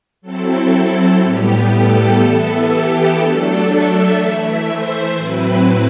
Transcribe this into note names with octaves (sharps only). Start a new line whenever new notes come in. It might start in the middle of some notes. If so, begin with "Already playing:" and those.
F#3 C4 E4 A4
A2 G3 B3 G4
A4
E3 B3 E4 A4
G4
F#3 A3 D4 A4
E5
E3 A3 E4 E5
C5
A2 F#3 C4 E4 B4